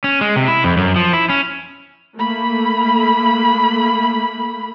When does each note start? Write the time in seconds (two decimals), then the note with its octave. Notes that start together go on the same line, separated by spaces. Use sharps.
0.04 C#4
0.21 G#3
0.36 C3
0.48 E4
0.64 F2
0.77 F#2
0.96 F3
1.13 E4
1.30 C#4
2.17 A3 A#3 B5